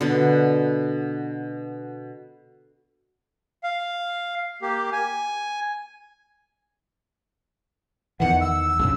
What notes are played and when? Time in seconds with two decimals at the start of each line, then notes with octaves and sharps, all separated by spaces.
0.01 B2 D3
3.64 F5
4.62 A#3 G4
4.92 G#5
8.20 E2 D#3 E3 F#5
8.41 E6
8.79 A#1 F#2 C#3